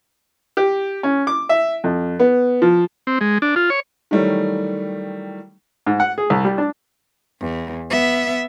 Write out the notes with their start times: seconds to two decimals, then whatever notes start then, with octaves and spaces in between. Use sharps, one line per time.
0.57 G4
1.03 C#4
1.27 D6
1.49 E5
1.84 F2
2.19 B3
2.62 F3
3.07 C4
3.21 G#3
3.42 D4
3.56 F4
3.70 C#5
4.11 D#3 E3 F#3 G3 A3
5.87 G#2
6.00 F#5
6.18 G#4
6.30 C2
6.45 G3
6.58 D4
7.41 E2
7.90 B3 E5